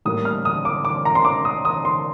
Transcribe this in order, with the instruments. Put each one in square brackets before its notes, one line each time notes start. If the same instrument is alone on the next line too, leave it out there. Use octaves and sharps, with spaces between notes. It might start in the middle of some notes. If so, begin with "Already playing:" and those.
[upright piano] A2 G3 A#3 D#6
F6
D#6
D6
D6
A#5
C6
D6
D#6
D#6
C6